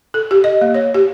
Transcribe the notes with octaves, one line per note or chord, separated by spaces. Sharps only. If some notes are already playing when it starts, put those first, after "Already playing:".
A4
G4
D#5
A#3
C#5
G4